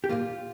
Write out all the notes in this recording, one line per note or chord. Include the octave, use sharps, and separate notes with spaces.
G4
A#2 G3 A#3 F4